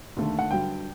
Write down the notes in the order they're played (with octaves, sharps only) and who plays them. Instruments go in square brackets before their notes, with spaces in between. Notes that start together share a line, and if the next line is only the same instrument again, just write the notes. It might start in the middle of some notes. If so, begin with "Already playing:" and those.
[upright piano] D#2 D3 A3
F#5
G2 D3 F#3 G5